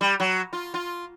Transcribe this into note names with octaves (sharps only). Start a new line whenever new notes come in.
G3
F#3
F4
F4